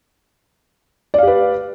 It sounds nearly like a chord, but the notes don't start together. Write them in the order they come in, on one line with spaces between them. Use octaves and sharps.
D5 F5 G4 B4